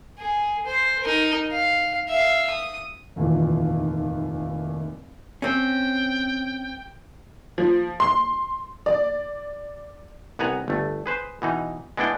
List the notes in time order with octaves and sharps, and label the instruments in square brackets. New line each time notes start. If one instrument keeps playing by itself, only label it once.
[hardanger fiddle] G#4
C5
D#4 A#4
F5
E5 F5
D#6
[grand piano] F1 D#2 A#2 E3
[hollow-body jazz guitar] C4 C#4 [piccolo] G5
[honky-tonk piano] F3
C6
D5
[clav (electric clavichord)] C2 B3 F#5 G#5 A#5
G1 A3
G#4 B4 C5
B2 E3 D#4
G#3 B3 D4 E4 G5